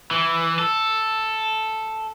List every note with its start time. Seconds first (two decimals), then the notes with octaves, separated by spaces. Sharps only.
0.11 E3
0.59 A4